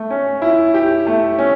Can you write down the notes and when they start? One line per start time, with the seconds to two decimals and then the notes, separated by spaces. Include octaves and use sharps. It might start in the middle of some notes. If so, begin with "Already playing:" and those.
Already playing: A3
0.11 C#4
0.42 E4
0.74 G4
1.07 A3
1.39 C#4